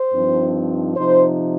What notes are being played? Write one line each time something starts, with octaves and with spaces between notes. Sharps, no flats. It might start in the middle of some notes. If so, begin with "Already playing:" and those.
Already playing: C5
G2 F3 C4 D#4
C3 F3 D#4 C5